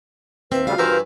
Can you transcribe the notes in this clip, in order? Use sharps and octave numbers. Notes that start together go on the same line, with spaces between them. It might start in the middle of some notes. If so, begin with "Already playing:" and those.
D#2 C4 B4 E5
D2 C#3 G3 F4 F#4 F5
G2 E3 A#4 C5 E5 A#5